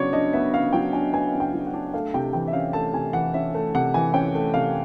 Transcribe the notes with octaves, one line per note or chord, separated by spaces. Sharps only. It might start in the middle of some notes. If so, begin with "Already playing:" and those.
Already playing: C#3 F#3 B3 D4 C#5 D5
D4 D#5
B3 E5
C#3 F5
F#3 G5
D4 G#5
B3 G#5
C#3
G5
F#3
F#5
D4
A3 F5
C3 G5
E3 G5
E5
C#4 F5
A3 A5
C3 G#5
E3 F#5
C#4 E5
A3
C3 F#5
E3 G#5
C#4 G5
A3
C3 F5